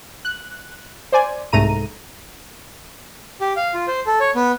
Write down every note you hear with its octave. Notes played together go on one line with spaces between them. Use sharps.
F#6
C5 D5 G#5
C2 G#2 A3 A#5 D#7
G4
F5
F4
C5
A4
C#5
B3